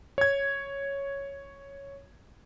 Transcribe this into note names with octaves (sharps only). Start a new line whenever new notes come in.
C#5 G#6